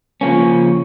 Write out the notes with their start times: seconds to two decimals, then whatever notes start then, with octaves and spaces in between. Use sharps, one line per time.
0.21 C#3 F3 A#3 C#4